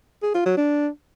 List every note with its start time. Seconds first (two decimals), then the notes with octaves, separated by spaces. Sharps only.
0.23 G#4
0.34 F4
0.46 F#3
0.57 D4